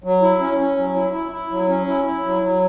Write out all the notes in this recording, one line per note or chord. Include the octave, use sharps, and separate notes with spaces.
F#3
E4
C#4
C#4
F#3
E4
E4
E4
F#3
C#4
E4
E4
F#3
F#3